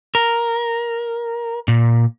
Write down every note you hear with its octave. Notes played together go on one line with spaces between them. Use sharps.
A#4
A#2